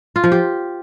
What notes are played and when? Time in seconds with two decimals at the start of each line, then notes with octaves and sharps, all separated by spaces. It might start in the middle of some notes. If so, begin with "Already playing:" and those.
0.16 F4
0.24 F3
0.32 G4